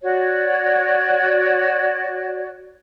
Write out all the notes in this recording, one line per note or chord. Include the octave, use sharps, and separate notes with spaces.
F#4 C#5 D5